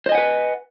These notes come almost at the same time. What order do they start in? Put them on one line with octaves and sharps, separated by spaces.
C5 D#5 G#5 F#5 B4